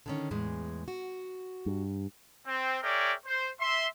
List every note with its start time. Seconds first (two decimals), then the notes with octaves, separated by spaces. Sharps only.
0.06 D3 D#3 C#4
0.31 E2 A2 G#3
0.88 F#4
1.66 G2
2.46 C4
2.83 G#4 A#4 C#5 D5 E5 G5
3.26 C5
3.61 E5 C6